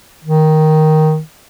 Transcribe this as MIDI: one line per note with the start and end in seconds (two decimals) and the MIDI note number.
0.25 1.19 51